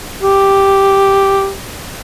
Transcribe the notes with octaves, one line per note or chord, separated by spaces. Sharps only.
G4